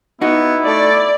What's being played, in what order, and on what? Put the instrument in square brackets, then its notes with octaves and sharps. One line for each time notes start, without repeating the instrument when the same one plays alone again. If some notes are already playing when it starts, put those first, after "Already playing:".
[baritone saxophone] B3 [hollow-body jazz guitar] D#4 F#4 [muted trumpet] E4
[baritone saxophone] A3 [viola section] D5